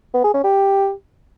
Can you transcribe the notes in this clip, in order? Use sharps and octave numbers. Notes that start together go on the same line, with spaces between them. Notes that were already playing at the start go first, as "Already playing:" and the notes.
B3
G#4
C#4
G4